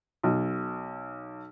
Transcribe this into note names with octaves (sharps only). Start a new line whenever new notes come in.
B1